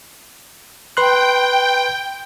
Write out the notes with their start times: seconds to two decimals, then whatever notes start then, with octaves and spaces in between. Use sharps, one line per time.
0.97 B4 G5 C6 F#6